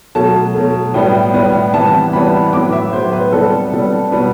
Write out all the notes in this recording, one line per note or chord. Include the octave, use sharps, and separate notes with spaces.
B2 F#3 A3 A5
B2 F#3 A3
A2 G3 B3 G5
A2 G3 B3
C3 E3 G3 B3 A5
C3 E3 G3 B3 B5
A2 F#3 B3 D6
E5
A2 F#3 B3 C5
B4
C3 G3 B3 A4
C3 G3 B3
B2 G3 B3